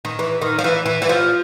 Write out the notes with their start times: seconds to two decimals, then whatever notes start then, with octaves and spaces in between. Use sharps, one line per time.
0.05 D#3
0.19 E3
0.41 D#3
0.58 F3
0.64 E3
0.86 E3
1.02 E3
1.09 F3